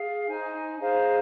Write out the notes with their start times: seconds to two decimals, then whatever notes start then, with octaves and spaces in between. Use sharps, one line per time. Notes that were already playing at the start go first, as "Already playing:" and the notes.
Already playing: G#4 F5
0.27 D#4 C5 G#5
0.78 D#4 G#4 C5 F5